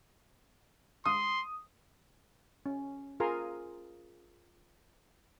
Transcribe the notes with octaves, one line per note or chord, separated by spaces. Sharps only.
C6 D#6
C#4
F4 G#4 A#4 G#5 A#5 C6